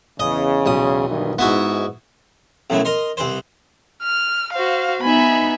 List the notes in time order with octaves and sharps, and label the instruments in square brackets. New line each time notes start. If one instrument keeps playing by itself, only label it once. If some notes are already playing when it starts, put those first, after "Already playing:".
[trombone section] E2 C#3 [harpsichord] D#5
[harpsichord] B1 D#6
[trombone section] G2 D#3 E3
[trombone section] G#2 [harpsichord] B3 E4 F#4
[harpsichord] B1 F#2 A2 E4
A#4 D#5 C6
C2 C4 B4 C5
[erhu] F6
[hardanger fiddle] F#4 C5 [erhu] F5
[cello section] B3 D#4 [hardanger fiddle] E5 G#5 [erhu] B5